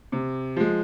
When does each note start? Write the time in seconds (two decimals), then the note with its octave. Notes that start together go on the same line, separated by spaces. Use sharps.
0.12 C3
0.57 F3 G#3